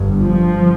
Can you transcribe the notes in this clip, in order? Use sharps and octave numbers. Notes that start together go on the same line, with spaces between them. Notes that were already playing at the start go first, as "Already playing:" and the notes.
Already playing: G1 G2
F3